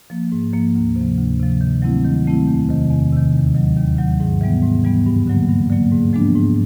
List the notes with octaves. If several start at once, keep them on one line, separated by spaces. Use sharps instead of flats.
F3 A#3
G#2
F3 A#3
D2
C3 F3
D2
C3 F3
D#3
F#3 A3 C4 E4
D#3
F#3 A3 C4 E4
E2
C3 D#3
E2
C3 D#3
D#2
D#3 F#3
D#2
D#3 F#3
G#2
E3 G3 B3
G#2
E3 G3 B3
G2
D3 F#3 A#3
G2
D3 F#3 A#3
G#2
F3 G#3 B3 D4
G#2